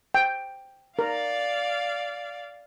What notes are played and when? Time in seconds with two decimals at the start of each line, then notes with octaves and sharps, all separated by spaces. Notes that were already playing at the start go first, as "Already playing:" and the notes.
0.14 G5
0.99 A#4 D5 F5